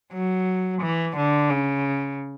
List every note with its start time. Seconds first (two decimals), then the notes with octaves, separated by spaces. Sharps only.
0.13 F#3
0.81 E3
1.16 D3
1.50 C#3